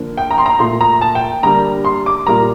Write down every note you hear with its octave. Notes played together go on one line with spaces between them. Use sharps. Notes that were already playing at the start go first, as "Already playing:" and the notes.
Already playing: D3 F3 A#3
G5
A#5
C6
A#5
A#2 A3 C6
A#5
A5
G5
D3 G3 A#3 A#5
C6
D6
A#2 G3 A#3 A#5